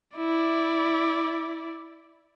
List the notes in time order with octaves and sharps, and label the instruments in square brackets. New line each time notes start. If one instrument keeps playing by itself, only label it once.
[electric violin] E4 D5